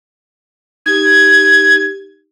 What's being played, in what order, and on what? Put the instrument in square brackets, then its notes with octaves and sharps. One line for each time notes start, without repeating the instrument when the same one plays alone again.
[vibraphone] D#4 G4 [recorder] G#6